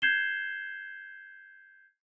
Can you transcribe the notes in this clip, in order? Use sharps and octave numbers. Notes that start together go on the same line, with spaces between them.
G6 G#6 C7 E7 G7